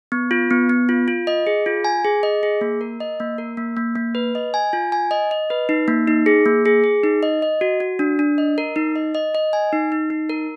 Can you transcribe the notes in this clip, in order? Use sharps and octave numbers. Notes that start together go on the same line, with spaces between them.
B3
F4
B3
B3
F4
F4
D#5
G#4
F4
G#5
G#4
D#5
G#4
A#3
A#4
D#5
A#3
A#4
A#3
A#3
A#3
B4
D#5
G#5
F4
G#5
D#5
D#5
B4
D#4
A#3
D#4
G#4
A#3
G#4
G#4
D#4
D#5
D#5
F#4
F#4
D4
D4
D#5
A#4
D#4
D#5
D#5
D#5
G#5
D#4
D#4
D#4
A#4